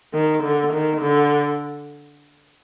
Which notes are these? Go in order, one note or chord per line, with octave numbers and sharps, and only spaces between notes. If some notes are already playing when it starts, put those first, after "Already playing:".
D#3
D3
D#3
D3